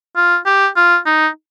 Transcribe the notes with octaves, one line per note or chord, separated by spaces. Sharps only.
F4
G4
F4
D#4